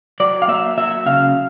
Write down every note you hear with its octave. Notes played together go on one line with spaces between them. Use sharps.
F#3 D5
F5
A#3 E5
F#3 E5
C#3 F5